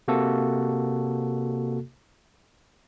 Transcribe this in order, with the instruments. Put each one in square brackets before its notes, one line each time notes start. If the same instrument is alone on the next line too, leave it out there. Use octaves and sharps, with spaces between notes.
[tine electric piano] C3 A#3 F#4 A4